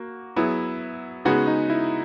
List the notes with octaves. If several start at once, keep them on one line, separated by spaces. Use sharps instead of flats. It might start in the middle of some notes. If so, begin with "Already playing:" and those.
Already playing: A#3 F#4
F#3 B3 E4 G#4
C#3 G#3 B3 D#4 F#4
D#4
E4